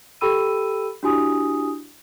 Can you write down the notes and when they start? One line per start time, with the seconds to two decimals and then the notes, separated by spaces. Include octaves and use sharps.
0.21 G4 A4 G5 B5 E6 D#7
1.03 D4 E4 F#4 G4 G#5 D#6